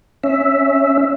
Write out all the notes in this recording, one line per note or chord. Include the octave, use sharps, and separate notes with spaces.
C#4 E5